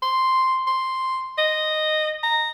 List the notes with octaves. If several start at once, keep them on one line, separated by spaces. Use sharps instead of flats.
C6
C6
D#5
A#5